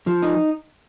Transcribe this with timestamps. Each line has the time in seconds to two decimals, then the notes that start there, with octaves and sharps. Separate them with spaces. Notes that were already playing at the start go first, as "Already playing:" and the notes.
0.07 F3
0.23 D#4